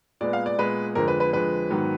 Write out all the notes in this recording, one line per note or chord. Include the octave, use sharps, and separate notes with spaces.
A#2 G#3 B3 D5
F5
D5
A#2 G#3 B3 B4
F2 D3 F3 G#3 A#4
B4
B4
F2 D3 F3 G#3 B4
G#2 D#3 F#3 B3